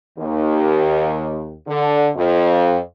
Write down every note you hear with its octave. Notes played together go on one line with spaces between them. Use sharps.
D#2
D3
F2